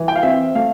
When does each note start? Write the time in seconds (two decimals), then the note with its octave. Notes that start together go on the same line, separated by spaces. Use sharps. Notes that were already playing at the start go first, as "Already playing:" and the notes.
Already playing: E3
0.08 G5
0.16 F5
0.23 C4 E5
0.55 A3 F5